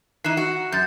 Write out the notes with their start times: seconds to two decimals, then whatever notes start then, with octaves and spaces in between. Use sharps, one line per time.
0.24 E3 D#4 C7 E7
0.37 F#4
0.72 F#2 G6 A6